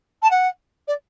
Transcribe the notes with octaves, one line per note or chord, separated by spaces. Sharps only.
A5
F#5
D5